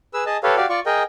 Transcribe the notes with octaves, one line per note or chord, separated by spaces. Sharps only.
G#4 B4 E6
G#4 D#5 A5
G4 A4 B4 C#5 F5
F#4 G4 D5 F5
F4 D5 C#6
G#4 A#4 D#5 G5